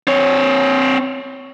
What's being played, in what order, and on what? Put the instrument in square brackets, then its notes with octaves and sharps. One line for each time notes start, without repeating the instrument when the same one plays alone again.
[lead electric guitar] C4 C#5